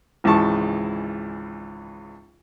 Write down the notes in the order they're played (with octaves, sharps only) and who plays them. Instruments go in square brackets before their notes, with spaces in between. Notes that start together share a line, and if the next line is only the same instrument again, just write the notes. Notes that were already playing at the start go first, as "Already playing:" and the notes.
[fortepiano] G#1 C#2 E3 G#3 A5 C#6